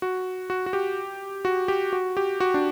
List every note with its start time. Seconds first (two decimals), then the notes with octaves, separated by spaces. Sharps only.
0.02 F#4
0.50 F#4
0.66 F#4
0.73 G4
1.45 F#4
1.68 G4
1.93 F#4
2.17 G4
2.40 F#4
2.54 D4